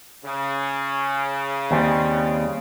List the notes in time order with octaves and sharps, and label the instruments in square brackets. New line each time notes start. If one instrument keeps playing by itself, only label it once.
[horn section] C#3
[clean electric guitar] D#2 G3 C4